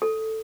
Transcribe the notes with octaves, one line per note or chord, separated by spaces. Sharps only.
A4